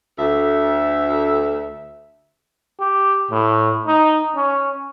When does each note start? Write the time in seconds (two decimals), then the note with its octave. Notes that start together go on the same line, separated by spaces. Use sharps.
0.18 D2 E5
2.80 G4
3.31 A2
3.87 D#4
4.36 C#4